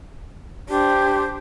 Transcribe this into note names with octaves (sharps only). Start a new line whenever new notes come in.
D4 G4 C5